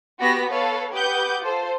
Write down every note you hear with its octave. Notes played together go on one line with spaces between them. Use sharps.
B3 F#4 G4 B4 A#6 B6
A4 B4 C#5 F5
G4 B4 F#5 D6 D#6 G6
F4 A4 C5